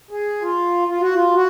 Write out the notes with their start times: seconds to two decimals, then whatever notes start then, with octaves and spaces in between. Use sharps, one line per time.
0.11 G#4
0.42 F4
0.88 F4
1.01 F#4
1.14 F4
1.34 F#4